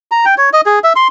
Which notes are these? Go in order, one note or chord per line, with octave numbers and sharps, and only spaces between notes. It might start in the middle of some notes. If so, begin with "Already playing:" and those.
A#5
G5
C#5
D#5
G#4
E5
C6